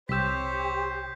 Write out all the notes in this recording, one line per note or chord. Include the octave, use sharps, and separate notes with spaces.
C2 G4 C5 C#5 E6 G6 B6